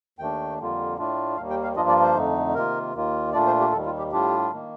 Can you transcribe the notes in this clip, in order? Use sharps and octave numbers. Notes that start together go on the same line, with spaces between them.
D#2 D#3 A3 D4 G5
F2 D3 G3 A#3 F4
A2 A3 D4 F4
D#2 D#3 G3 A#3 F5
G5
F5
G2 F3 A#3 D4 F4 D#5
D5
C5
F2 D3 A3 D#4
C3 D#3 A#3 F4 A#4
D#2 D#3 A#3 F4
A#2 A3 D4 F4 D5
C5
G4
D#2 D#3 G3 A4
F4
G4
A2 G3 D4 F4 G4
D#3 A#3